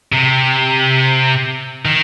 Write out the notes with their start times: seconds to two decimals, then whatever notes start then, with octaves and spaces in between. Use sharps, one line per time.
0.12 C3
1.85 D#3